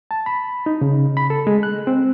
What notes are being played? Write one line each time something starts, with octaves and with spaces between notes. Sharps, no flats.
A5
B5
D#4
C#3
B5
A4
G#3
F#6
C4